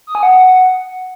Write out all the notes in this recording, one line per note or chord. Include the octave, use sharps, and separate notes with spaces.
D#6
G#5
F#5